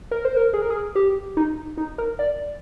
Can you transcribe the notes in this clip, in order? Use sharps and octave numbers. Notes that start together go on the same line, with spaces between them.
A#4
C5
A#4
G#4
A#4
G#4
G4
D#4
D#4
A#4
D5